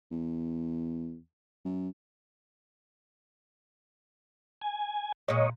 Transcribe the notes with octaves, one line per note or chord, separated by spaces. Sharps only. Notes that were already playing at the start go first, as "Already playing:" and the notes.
E2
F#2
G#5
A#2 G#3 C#5 D#5